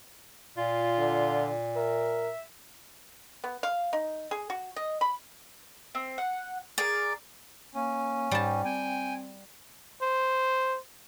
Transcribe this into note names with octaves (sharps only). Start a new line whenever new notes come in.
A#2 F4
D3
A#4 E5
B3
F5
D#4
G#4
F#4
D#5
B5
C4
F#5
G#4 A#4 D5
A#3 C#4
G#2 G3 A5
C4 G5 G#5
C5